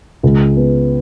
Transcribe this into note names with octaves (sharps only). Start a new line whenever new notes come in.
C#2
B3